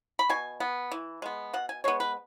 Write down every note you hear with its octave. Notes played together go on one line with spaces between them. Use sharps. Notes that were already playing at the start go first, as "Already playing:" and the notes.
B5
B2 G#5
B3
E3
G#3 B3
B2 F#5
G#5
G#3 B3 C#5
B4